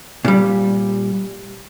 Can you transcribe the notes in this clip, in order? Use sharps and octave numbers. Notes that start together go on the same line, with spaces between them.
A#2 G3